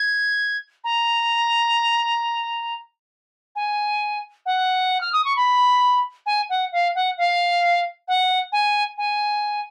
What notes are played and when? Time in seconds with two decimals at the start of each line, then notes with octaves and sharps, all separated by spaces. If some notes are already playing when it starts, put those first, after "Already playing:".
Already playing: G#6
0.84 A#5
3.55 G#5
4.46 F#5
5.01 F6
5.12 D#6
5.25 C#6
5.36 B5
6.26 G#5
6.49 F#5
6.72 F5
6.95 F#5
7.17 F5
8.08 F#5
8.52 G#5
8.97 G#5